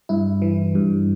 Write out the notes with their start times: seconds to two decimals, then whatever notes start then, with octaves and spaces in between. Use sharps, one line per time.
0.09 G2 E4
0.42 E3
0.75 G2